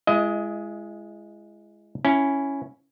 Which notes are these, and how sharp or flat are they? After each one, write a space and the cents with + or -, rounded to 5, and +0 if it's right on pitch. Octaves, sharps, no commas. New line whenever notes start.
G#3 +0 E4 +40 D#5 +20
C#4 +0 E4 +0